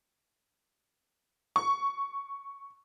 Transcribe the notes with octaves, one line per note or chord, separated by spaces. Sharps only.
C#6